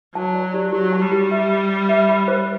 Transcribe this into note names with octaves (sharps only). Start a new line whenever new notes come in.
F#3 A5
D5
G4
F#3 G4
A5
G3
G4
E5
B5
B5
E5
B5
C5